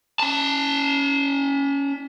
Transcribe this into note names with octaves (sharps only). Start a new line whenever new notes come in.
C#4 A5